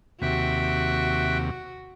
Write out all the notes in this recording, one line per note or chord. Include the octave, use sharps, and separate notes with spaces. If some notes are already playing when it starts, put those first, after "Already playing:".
D#2 C3 F#4 E5 G5 F#6